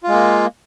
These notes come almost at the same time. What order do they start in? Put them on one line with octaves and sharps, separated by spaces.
F4 G#3 A#3